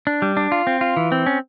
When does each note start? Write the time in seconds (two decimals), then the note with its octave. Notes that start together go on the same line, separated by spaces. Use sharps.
0.07 D4
0.22 G3
0.37 D4
0.52 F4
0.67 C4
0.81 F4
0.97 E3
1.12 C4
1.26 C#4